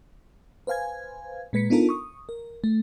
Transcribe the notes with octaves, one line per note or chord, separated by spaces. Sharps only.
B4 C5 F5 G#5 G#6
A#2 G#3 B4 B6 C#7
B3 D4 D#4 F4 A4 A#4
C#6 D#6
A#4
A3